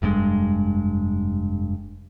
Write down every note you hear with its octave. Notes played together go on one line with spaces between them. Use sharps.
F1 G2 A#2 G#3